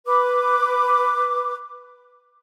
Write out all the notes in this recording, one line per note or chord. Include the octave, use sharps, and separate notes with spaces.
B4 D6